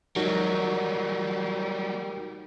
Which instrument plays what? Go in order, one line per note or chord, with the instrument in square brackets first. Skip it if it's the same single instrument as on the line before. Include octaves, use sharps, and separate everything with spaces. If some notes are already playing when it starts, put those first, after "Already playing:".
[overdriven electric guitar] F#3 G3 [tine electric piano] D#4 F#4 A#4